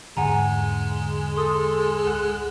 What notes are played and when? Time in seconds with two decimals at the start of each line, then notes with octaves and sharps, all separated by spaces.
0.17 E2 G#2 D3 G#3 F#5 G#5 A#5
1.36 A4 C6 D#6
2.06 C#2 F#5 F#6